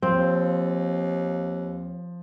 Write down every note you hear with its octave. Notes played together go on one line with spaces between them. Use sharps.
D#2 F3 C4